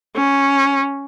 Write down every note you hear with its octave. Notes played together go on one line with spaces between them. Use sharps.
C#4